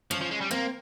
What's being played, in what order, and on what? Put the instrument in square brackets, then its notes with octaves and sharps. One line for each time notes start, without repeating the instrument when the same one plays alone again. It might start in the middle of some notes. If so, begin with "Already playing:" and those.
[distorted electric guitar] F3 [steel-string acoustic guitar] C#4
[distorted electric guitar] F3
G#3
G3
[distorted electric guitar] A#3 [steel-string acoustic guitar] C4